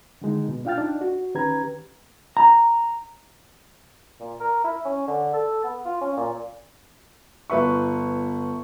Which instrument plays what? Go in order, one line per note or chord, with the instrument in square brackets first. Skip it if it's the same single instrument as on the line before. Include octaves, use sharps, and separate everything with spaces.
[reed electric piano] D3 D#3 G#3 D#4
B2
D4 F4 F5 G5 F6 A6
D4 D#4
F#4
D#3 C#4 G4 B4 A#5 G#6
[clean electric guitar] A#5
[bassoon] A#2
A#4
E4
C#4
D3
A4
B3
F4
C#4
A#2
[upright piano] G1 B4 E5 C#6